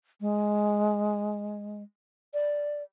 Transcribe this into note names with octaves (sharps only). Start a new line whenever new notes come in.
G#3
D5